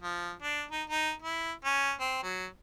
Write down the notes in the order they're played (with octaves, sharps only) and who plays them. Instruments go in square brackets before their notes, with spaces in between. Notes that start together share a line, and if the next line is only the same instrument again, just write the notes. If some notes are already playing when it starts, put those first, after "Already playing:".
[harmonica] F3
D4
D#4
D#4
E4
C#4
C4
F#3